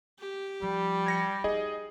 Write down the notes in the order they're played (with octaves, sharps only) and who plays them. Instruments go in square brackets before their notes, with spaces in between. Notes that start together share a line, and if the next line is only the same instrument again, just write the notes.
[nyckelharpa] G4
[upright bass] F3 [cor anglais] G3
[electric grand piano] G#6 A#6 C#7
[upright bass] D#4 [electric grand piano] G#4 D#5